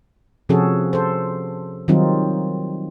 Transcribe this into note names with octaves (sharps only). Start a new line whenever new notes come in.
C3 F3 C#4 F#4 G#4 A4
A4 C5
D#3 F#3 G3 C4 D#4 F4